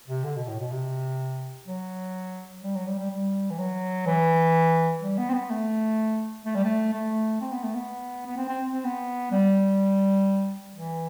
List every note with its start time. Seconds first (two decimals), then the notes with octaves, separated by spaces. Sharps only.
0.08 C3
0.24 D3
0.36 B2
0.48 A2
0.60 B2
0.71 C3
1.67 F#3
2.63 G3
2.75 F#3
2.87 G3
2.99 G3
3.10 G3
3.50 E3
3.59 F#3
4.07 E3
5.01 G3
5.18 B3
5.30 C4
5.34 B3
5.50 A3
6.45 A3
6.55 G3
6.64 A3
6.93 A3
7.41 C4
7.52 B3
7.63 A3
7.75 B3
8.27 B3
8.37 C4
8.49 C4
8.72 C4
8.85 B3
9.32 G3
10.76 E3